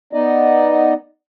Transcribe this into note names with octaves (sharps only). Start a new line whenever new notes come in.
B3 D#4 D5 D#5